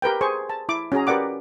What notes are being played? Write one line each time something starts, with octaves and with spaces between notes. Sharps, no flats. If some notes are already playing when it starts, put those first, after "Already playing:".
G4 A#4 B4 G5
G#4 C5 C#6
A5
E4 D6
C#4 F#4 G#4 A#5
G4 A#4 B4 D5 F#5 D6